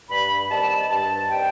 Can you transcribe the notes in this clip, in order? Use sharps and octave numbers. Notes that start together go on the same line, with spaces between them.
G2 B5
D#3 G3 C4 A5
G2 A5
D#3 G3 C4 G5